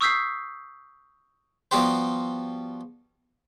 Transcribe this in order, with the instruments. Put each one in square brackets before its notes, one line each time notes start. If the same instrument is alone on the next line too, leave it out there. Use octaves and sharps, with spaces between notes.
[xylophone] C#6 D#6 E6 G6 B6 C7
[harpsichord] F3 G3 B3 F#4 G4 C5